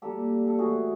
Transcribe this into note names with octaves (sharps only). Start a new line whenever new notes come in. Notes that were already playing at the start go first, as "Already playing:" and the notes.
A#2 G3 A#3 G4 A4
A4
A2 E3 A3 F#4 G#4